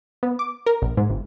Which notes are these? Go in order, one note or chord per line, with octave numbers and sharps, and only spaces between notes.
B3
D6
A#4
A#1
G#2
G1